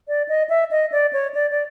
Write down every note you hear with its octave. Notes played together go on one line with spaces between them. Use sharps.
D5
D#5
E5
D#5
D5
C#5
D5
D5